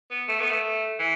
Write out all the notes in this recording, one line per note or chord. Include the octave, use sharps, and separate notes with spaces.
B3
A3
B3
A3
E3